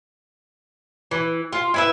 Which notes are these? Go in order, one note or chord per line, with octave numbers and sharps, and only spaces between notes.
E3
F4
E4 B4 E5